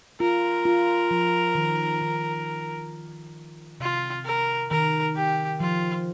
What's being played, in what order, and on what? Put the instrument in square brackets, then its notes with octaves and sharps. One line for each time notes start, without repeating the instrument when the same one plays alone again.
[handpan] F4 [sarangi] A#4
[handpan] F4
F3
D#3
D#3
[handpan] C3 [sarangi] F4
[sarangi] A#4
[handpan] D#3 [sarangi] A#4
[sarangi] G4
[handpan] F3 [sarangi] F4